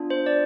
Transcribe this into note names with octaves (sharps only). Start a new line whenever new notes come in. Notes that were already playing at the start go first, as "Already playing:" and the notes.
Already playing: B3 D4 F4 G#4
C5
D5